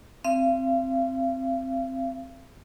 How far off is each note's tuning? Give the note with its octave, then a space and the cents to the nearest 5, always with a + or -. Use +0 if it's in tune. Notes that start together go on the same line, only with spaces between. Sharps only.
C4 +0 F5 -40